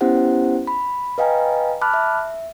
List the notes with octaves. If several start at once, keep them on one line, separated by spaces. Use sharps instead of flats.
B3 C#4 E4 G4 C5 F#5
B5
B4 D#5 F5 G5 G#5 A#5
A5 B5 D6 F6 F#6
E5